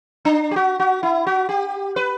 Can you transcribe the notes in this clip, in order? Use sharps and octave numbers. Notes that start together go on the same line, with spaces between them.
D4
G4
F#4
F#4
E4
F#4
G4
B4